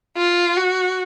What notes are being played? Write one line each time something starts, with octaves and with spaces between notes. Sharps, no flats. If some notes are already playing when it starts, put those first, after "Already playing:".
F4
F#4